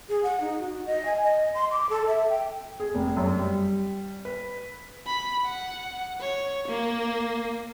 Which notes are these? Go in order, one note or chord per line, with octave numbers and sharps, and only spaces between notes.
G#4
F#5
D#4
F#4
D#5
G#5
D#5
C6
D6
A4
E5
G5
G#4
F1
F#2
G3
B4
B5
F#5
C#5
A#3